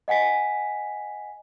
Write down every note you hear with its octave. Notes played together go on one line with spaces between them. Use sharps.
D#5 F#5 G#5 B6